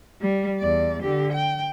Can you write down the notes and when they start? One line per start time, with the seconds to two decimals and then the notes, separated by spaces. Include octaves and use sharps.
0.21 G3
0.59 E2 D5
1.02 D3 G4
1.33 G5